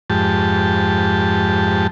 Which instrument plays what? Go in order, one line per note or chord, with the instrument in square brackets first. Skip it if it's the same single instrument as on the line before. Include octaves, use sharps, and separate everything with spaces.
[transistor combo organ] F2 G#2 G4 A5